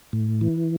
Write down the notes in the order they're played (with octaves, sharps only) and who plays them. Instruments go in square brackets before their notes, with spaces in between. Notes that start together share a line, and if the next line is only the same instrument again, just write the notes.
[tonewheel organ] A2
E3